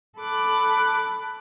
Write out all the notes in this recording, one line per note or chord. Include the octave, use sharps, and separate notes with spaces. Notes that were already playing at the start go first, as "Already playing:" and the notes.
A4 B5 D6 F#6